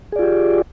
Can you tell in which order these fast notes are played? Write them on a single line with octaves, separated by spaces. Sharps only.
G#4 D5 F4 G4